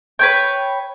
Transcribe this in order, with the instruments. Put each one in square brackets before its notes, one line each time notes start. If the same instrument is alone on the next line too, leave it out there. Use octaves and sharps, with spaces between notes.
[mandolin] B4 C#5 G5